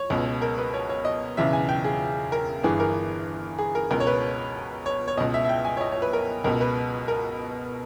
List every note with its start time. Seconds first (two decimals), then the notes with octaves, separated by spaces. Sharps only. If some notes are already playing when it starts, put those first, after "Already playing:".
Already playing: C#5
0.10 C#2 B2
0.42 A#4
0.58 B4
0.73 C#5
0.89 C#5
1.05 D#5
1.37 E1 E2 C#3 E5
1.53 G#5
1.69 G5
1.84 G#4
2.32 A#4
2.63 G1 G2 E3 G#4
2.80 A#4
3.59 G#4
3.75 A#4
3.91 C#2 B2 A#4
4.00 C#5
4.07 B4
4.86 C#5
5.08 C#5
5.17 C#2 B2 D#5
5.34 E5
5.45 E5
5.49 G5
5.65 G#5
5.77 C#5
5.81 D#5
5.92 C#5
6.02 B4
6.13 A#4
6.44 C#2 B2 A#4
6.61 B4
7.08 A#4